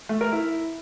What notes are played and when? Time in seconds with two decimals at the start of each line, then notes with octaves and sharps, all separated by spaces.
0.09 A3
0.21 A#4
0.32 E4